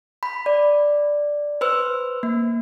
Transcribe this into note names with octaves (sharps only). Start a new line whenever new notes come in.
B5
D5
B4 C5 E6
A#3